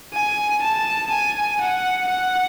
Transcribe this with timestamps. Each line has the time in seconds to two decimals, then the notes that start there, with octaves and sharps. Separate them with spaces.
0.13 G#5
0.62 A5
1.12 G#5
1.60 F#5
2.08 F#5